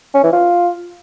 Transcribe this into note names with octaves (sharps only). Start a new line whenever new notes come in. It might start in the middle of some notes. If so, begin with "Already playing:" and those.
C#4
E3
F4